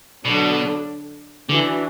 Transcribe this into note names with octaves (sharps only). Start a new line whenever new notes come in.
B2 D3 F#3 D4
D3 E3 D4 F#4